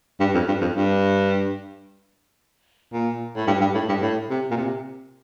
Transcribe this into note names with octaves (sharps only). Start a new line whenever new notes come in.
G2
F2
G2
F2
G2
A#2
A2
G2
G2
A2
G2
A2
C3
A#2
C3